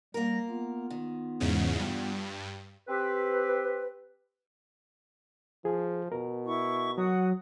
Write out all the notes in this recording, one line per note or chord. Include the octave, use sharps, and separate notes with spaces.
G3 A#3 A#4 A#6
B3 F4
D#3
E2 G#2 C#3
G2 G4
C4 G4 B4
F3 G#4
B2 A#4
E4 C#6
F#3 F#4 F#5 D#6